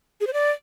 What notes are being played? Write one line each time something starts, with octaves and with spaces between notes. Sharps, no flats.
G#4
C5
D5